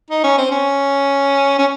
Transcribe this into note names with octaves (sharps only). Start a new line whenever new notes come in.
D#4
C#4
C4
C#4
C#4